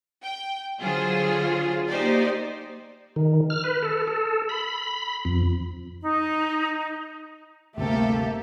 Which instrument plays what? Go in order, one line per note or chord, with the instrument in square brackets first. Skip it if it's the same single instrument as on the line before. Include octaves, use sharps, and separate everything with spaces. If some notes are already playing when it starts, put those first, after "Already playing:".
[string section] G5
D3 F#3 F4 G#4 C5
A#3 D#4 G4 C5 D5
[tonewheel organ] D#3
F6
B4
A4
A4
B5
F2
[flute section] D#4
[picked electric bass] G1 D2 C3 [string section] A3 G4 A4 [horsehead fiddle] A#3 E5